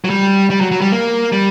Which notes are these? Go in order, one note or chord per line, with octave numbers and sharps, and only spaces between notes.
F#3
G3
G3
F#3
F#3
G3
A#3
G3